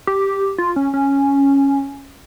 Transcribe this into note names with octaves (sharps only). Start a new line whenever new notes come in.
G4
F4
C#4
C#4